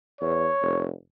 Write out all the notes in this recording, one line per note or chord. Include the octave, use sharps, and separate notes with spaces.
E2 C#5
F1